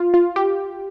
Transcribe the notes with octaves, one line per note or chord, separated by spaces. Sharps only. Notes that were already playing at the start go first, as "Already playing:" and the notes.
Already playing: F4
F4
G4